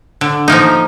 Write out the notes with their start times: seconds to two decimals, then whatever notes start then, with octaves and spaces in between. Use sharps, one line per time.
0.21 D3
0.48 F3 A#3 D#4